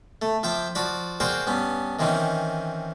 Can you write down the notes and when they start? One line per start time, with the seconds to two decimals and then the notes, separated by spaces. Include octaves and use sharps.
0.22 A3
0.43 F3 E5 G5 D6
0.75 F3 F#4 D5 B5
1.20 F#4 G#4 A#4 C5 D5 G5
1.47 G2 B3 C#4
1.99 D#3 E3 C4 C#4 D#4